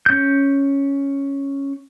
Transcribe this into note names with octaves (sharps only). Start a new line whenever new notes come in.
C#4 G6